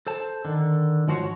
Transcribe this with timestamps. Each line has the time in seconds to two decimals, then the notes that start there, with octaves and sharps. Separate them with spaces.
0.07 A4 C5 A5
0.45 D3 D#3
1.08 G#2 F3 F#4 C5 C#5